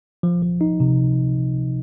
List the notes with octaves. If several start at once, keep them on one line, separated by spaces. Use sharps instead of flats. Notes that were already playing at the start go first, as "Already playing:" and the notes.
F3
F3
D#4
C3